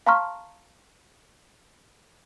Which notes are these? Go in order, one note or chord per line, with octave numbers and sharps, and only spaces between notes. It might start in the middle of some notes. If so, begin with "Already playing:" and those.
F5 A5 A#5 C6 C#6 F6